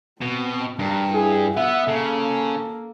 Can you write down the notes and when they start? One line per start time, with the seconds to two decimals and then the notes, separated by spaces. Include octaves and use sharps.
0.21 B2 C4
0.79 G2 A#4
1.14 E4 G#4
1.57 B3 B4 E5 F#5
1.88 C#3 A#3 A4